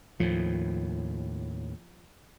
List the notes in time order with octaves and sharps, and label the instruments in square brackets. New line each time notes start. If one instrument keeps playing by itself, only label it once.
[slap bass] D#2 A2 [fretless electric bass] F3